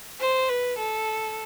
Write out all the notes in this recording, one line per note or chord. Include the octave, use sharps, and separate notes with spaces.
C5
B4
A4